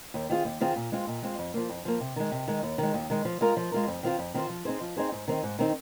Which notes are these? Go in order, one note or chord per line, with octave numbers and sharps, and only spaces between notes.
D#2
D#3 C4 F4 G#4
D#2
D#3 C4 F4 G#4
A#2
G#3 C4 F4
A#2
G#3 C4 F4
F2
F3 A#3
F2
F3 A#3
C3
D#3 G#3
C3
D#3 G#3
D#2
D#3 G#3
D#2
D#3 G#3
F3
G#3 F4 A#4
F3
G#3 F4 A#4
F2
D#3 C4 F4 C5
F2
D#3 C4 F4 C5
F3
C4 D#4 G#4 C5
F3
C4 D#4 G#4 C5
G#2
D#3 C4 D#4
G#2
D#3 C4 D#4